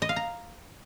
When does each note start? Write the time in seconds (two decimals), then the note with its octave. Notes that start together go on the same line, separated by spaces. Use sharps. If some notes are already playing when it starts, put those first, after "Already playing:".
0.02 D#5
0.09 F5
0.16 A#5